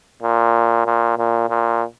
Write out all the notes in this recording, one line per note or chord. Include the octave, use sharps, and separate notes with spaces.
A#2
A#2
A#2
A#2